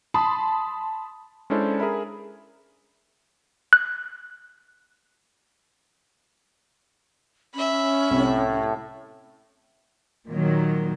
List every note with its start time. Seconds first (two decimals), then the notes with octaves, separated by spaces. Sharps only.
0.14 A5 B5 C6 D#6
1.50 G#3 C#4 D4 E4 A4 C5
1.80 G#4 A#4 E5 B5
3.73 F#6
7.54 C#4 E5 B5
8.11 C2 A2
10.29 A#2 D#3 F#3